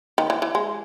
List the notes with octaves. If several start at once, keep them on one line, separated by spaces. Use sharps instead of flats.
D#3
E3
E3
G#3